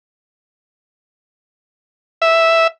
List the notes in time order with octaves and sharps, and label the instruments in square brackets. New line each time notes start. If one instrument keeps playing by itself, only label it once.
[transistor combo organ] E5